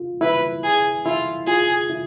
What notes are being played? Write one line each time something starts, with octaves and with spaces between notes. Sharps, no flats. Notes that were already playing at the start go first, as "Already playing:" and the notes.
Already playing: F4
E4 B4
G#4
E4 F4
F4 G#4
E4